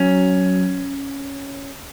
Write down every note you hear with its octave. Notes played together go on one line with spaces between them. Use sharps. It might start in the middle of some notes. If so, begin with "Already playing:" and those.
Already playing: F#3 C#4